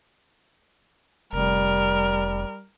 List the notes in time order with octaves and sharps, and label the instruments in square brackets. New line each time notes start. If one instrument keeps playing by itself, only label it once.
[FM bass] F1 [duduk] G3 [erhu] A#4